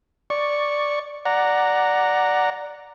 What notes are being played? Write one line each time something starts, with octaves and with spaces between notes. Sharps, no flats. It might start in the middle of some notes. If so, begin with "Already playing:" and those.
D5 C#6
D5 F#5 A#5